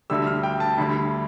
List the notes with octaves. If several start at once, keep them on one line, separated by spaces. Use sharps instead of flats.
D2 D3 G3 E6
F6
G5
A5
D2 D3 G3 B5